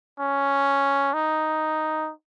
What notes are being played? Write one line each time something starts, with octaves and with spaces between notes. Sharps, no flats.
C#4
D#4